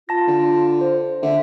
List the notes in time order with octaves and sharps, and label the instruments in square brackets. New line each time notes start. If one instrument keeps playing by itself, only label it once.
[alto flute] F4 [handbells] A5 A#6
[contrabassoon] D3
[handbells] C5
[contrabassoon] D3 [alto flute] E5